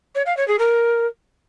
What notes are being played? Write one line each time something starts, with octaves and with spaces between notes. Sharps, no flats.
C#5
F5
C#5
G#4
A#4